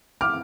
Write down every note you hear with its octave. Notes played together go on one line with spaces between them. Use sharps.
D6 F6